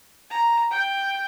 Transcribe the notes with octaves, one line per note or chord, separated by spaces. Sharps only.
A#5
G5